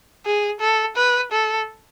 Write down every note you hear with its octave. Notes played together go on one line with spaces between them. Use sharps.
G#4
A4
B4
A4